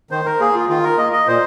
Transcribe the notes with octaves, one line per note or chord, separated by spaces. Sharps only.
D#3 C5
A#4
A#3 G#4
F4
D#3 F4
A#4
A#3 D#5
D#5
A#2 C5